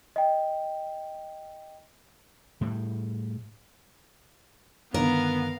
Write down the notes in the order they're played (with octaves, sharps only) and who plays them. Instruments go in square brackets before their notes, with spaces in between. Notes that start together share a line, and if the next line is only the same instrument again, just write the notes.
[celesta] D#5 G5
[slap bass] A2 G3
[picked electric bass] G2 D3 D#3 [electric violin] B3 [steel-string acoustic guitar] A#4 [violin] F5